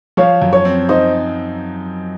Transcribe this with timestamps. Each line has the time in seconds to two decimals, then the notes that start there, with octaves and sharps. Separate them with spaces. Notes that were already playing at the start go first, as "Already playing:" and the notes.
0.17 F3 C#5 F5
0.42 F#2
0.53 C#5
0.65 C4
0.89 D#4 C5 D#5